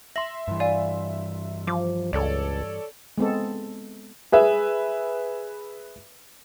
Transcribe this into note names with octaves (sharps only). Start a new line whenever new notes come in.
E5 C6 A#6 F#7
G2 E3
D5 F5 G#5
F3 D6
C#2 A4 C#5 D5
G#3 B3 C4 A4
G#4 B4 E5